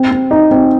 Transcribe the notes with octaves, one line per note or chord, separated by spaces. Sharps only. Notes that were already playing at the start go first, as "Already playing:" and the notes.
Already playing: C4
C4
D#4
C4